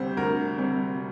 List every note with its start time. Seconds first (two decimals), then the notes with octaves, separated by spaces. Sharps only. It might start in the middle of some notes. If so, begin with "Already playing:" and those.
Already playing: D2 C3 G3 C4 C5
0.17 D2 A#4
0.58 C3 G3 C4